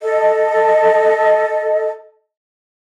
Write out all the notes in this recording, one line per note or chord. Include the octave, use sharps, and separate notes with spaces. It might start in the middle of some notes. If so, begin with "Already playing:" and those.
A4 D#5